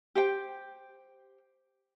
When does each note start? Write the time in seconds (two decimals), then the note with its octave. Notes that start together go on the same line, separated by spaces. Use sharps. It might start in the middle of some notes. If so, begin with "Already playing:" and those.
0.15 G4 C5 G5